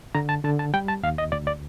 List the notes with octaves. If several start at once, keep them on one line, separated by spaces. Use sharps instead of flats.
D3 A#5
A5
D3 A5
A5
G3 G5
A5
D#2 F5
D#5
D2 D5
D5